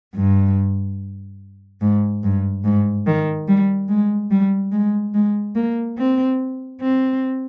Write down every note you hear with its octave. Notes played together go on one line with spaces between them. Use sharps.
G2
G#2
G2
G#2
D#3
G3
G#3
G3
G#3
G#3
A#3
C4
C4